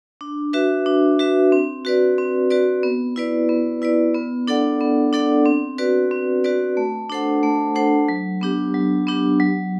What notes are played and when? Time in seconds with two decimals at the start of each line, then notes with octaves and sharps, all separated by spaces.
0.21 D4
0.53 F#4 B4 E5
0.86 D4
1.19 F#4 B4 E5
1.52 C4
1.85 F#4 B4 D5
2.18 C4
2.50 F#4 B4 D5
2.83 B3
3.16 E4 B4 D5
3.49 B3
3.82 E4 B4 D5
4.14 B3
4.48 D4 A4 D5 F#5
4.81 B3
5.13 D4 A4 D5 F#5
5.46 C4
5.78 F#4 B4 D5
6.11 C4
6.44 F#4 B4 D5
6.77 A3
7.10 D4 A4 C5 F#5
7.43 A3
7.75 D4 A4 C5 F#5
8.09 F#3
8.41 B3 D4 G4
8.74 F#3
9.07 B3 D4 G4
9.40 F#3